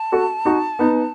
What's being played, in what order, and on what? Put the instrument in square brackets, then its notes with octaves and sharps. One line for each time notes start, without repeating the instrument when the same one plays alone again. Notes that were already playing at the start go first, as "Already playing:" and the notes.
Already playing: [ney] A5
[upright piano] F#4 A4
D#4 F#4
B3 D#4